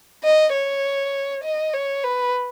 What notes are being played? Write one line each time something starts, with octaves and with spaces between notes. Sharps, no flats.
D#5
C#5
D#5
C#5
B4